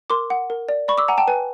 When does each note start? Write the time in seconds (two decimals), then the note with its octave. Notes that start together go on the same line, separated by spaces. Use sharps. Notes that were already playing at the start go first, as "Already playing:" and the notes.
0.10 A#4 C6 D6
0.30 F#5
0.50 A#4
0.69 D5
0.88 D5 B5 C#6
0.98 D6 E6
1.08 F#5 G#5 A#5
1.18 G5 A5
1.27 B4 G#5